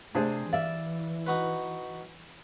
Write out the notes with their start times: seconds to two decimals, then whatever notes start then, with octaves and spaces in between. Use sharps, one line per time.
0.15 C3 A3 D4 G#4 C5
0.53 E3 D5 E5 F5
1.26 D#4 F#4 B4